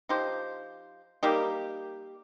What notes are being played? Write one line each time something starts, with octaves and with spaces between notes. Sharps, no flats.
F3 D#4 G4 C5
G3 A#3 D#4 G4